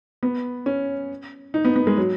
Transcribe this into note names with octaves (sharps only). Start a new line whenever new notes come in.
B3
C#4
D#4
B3
B3
G#3
F#3